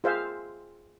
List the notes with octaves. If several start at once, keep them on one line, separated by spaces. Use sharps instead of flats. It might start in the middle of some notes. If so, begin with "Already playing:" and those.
F4 G#4 C5 E5 F5